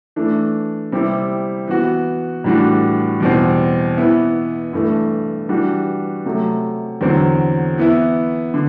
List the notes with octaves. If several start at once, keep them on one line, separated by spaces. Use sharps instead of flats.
E3 A3 D4
C3 G3 C4 E4
E3 B3 F#4
A2 E3 G3 D4 F#4
E2 B2 G3 C4
E3 B3 E4
G2 E3 A3
E3 G3 D4 F#4
C3 F#3 A3
E2 D3 F#3 C4
E3 B3 E4
D3